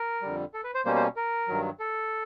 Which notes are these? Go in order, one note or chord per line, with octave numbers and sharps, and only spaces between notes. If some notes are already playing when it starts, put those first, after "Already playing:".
Already playing: A#4
F2 D3 G3
A4
B4
C5
B2 G3 A#3 C#4 C5
C5
A#4
G2 D#3 F#3
A4